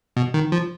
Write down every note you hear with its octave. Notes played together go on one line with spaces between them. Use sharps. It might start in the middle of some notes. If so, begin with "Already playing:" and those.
B2
D#3
F3